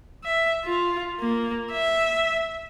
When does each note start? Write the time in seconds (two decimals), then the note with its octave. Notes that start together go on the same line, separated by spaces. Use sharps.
0.24 E5
0.65 F4
1.20 A#3
1.72 E5